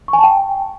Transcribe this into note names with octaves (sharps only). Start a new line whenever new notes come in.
C#6
G#5
A5
G5